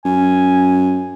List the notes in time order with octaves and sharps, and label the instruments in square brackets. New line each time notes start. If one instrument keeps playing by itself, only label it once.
[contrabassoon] F#2 [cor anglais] G#5